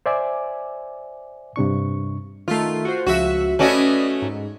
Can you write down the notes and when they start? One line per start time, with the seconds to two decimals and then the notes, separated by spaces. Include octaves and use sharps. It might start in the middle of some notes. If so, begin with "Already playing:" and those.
0.06 C5 D5 E5 G#5 D6
1.56 G2 C3 D4 C#6
2.48 D#3 A3 F4
2.85 F#4 C5
3.07 C#2 F3 F#4 E5
3.59 A3 C#4 F#4 B4 D5 D#5
4.22 G#2